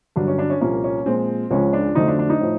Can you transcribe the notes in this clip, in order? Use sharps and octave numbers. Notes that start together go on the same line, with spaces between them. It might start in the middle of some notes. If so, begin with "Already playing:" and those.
G2 D3 F#3 D4
C#4
D4
C#4
C2 A#2 F3 A#3 C#4
C#4
A#2 F3 G#3 C4
C#2 C#3 F3 G#3 C#4
D4
F2 D3 F#3 A3 D#4
D4
D4
D#4
A2 F3